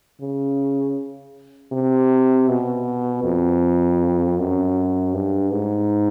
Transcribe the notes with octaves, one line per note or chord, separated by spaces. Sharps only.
C#3
C3
B2
F2
F#2
G2
G#2